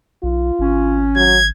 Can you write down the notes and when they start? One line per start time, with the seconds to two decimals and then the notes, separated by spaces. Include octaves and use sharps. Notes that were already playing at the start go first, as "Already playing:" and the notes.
0.23 B1 F4
0.59 G#1 C#4
1.16 F#3 G#6